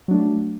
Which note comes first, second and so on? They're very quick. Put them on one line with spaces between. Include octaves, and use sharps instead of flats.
F#3 D4 A3